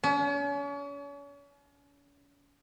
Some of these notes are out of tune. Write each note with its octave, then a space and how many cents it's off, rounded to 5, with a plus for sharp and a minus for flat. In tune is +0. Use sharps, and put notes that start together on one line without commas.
C#4 +40